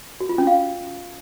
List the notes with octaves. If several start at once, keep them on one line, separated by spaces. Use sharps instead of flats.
F#4
F4
C#4
F5